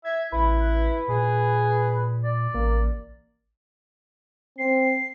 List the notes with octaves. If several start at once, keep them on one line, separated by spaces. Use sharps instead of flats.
E5 G#6
A1 E4 B4
A#2 G#4
D5
A1 A#3
C4 C7